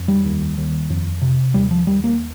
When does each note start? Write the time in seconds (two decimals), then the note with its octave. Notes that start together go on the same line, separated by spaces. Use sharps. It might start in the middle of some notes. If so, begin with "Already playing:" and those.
Already playing: F2
0.08 G3
0.25 D#2
0.57 D#2
0.90 F2
1.22 C3
1.54 D#2 G3
1.71 F3
1.87 D#2 G3
2.04 A#3